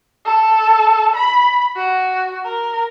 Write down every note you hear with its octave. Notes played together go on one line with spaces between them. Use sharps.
A4
B5
F#4
A#4